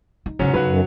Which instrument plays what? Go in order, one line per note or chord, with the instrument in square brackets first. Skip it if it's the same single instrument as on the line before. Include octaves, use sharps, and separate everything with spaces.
[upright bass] D#4
[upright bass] E2 C#3 [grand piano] G#2 F#3 C#4
[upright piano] B1 B4 [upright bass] C#3 [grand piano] F#3 F#4
[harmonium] F#2